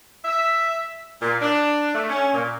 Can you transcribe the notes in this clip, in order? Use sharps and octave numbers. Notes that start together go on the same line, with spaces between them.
E5
A#2
D4
A3
C#4
A#2